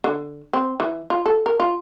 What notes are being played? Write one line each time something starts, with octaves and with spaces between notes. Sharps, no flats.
D3
C4
E3
F4
A4
A#4
F4